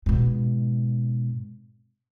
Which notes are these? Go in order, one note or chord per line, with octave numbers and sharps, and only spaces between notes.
G#2 B2